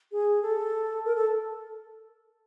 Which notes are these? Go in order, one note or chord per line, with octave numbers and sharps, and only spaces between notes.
G#4
A4
A#4
A4